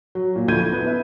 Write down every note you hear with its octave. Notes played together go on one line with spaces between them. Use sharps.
F#3
A#2
D2 F3 E4 G6 G#6 D#7
E4
B3
B4 E5